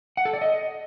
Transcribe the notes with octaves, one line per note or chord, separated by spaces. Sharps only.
F#5
A4
D5
D#5